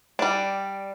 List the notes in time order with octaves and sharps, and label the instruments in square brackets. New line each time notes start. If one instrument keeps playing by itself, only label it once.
[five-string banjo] G3 D4